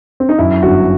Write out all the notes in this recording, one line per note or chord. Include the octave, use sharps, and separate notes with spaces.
C4
D#4
F#2 E4
G1 F#4